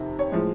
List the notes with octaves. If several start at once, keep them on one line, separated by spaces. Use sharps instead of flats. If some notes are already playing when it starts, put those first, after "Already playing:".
Already playing: F2 C3 D#3
C#5
A2 F3 G#3